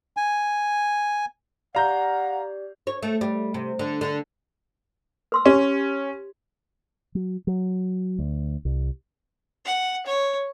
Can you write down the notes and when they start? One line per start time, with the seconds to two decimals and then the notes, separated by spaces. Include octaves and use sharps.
0.17 G#5
1.75 G4 D5 F5 F#5 A#5 G6
2.87 C#5
3.03 A3
3.21 G3
3.54 C3
3.79 D3
4.01 D3
5.32 B4 C6 E6
5.46 C#4 G4
7.15 F#3
7.47 F#3
8.19 D2
8.65 C2
9.65 F#5
10.06 C#5